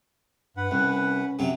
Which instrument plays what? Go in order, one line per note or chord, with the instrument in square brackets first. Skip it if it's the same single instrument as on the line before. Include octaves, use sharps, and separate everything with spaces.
[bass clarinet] G2 [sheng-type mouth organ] B4 F#5
[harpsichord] C2 [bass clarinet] C#4
[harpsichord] F#2 C3 F#3